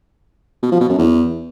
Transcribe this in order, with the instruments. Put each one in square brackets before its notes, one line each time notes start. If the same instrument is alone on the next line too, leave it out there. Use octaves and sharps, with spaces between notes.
[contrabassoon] B2
F3
B2
F#2
E2